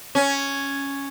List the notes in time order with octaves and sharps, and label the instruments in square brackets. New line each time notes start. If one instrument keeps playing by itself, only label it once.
[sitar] C#4